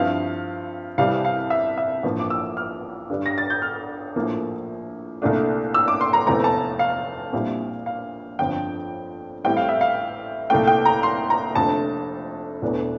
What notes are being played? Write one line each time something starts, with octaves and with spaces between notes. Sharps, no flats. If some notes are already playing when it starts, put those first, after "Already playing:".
Already playing: G2 F3 C4 E4 F5
C2 C3 E3 G3 C4 F5
F5
E5
E5
A1 G2 F3 A#3
D6
E6
F6
G2 D3 G3 D4
A#6
A6
G6
F6
A#1 A2 F3 A#3
C2 A#2 A3 D4
E6
D6
C6
A#5
F1 E2 E3 A3 C4 A#5
A5
F5
A#1 A#2 G3 C4 E4
F5
G1 F2 D3 F3 C4 G5
A1 A2 G3 C4 G5
F5
E5
F5
C2 A#2 A3 G5
G5
A#5
C6
A#5
F1 F2 D3 A3 A5
E1 E2 E3 A3 D4